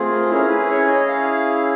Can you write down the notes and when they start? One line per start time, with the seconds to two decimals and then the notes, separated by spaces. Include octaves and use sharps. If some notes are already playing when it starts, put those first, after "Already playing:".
Already playing: A3 C4 F4 G#4
0.12 A#4
0.31 C#4 E4 G#4 A#4
0.50 B4
0.70 C#5
0.89 D#5
1.08 F5